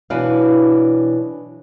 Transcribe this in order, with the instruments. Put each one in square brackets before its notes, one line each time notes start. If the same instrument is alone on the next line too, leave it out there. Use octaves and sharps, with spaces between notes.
[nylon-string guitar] B2 E3 F#3 D4 B4 F5